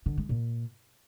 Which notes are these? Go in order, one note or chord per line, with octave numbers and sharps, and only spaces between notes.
D3
G#3
A#2